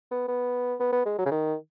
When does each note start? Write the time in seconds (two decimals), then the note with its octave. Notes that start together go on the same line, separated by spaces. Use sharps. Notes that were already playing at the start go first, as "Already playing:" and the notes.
0.11 B3
0.28 B3
0.80 B3
0.92 B3
1.06 G#3
1.18 F#3
1.26 C#3
1.31 D#3